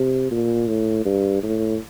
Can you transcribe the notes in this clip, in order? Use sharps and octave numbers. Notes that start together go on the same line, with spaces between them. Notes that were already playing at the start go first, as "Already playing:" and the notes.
Already playing: C3
A#2
A2
G2
A2